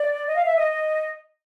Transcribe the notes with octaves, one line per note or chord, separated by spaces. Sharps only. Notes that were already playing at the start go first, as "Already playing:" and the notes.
Already playing: D5
D#5
F5
E5
D#5